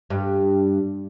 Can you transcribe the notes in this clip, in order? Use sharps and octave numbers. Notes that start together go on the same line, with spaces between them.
G2